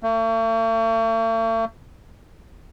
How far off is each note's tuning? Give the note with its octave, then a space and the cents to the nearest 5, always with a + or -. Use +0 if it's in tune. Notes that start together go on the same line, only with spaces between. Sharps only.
A3 +45